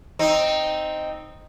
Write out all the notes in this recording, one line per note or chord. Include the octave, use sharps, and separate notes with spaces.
C4 D#4